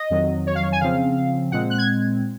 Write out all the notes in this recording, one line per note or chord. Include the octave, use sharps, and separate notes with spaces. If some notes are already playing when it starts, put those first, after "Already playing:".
Already playing: D#5
F2 D#3 F#3
C#5
F5
C#5
G#5
C#3 F3 C4 F5
A#2 G#3 C4 F#5
F#6
G#6